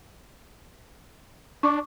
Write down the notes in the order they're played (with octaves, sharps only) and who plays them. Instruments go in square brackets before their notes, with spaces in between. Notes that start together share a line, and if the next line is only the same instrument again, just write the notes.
[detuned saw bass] D4 [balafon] C#6 D6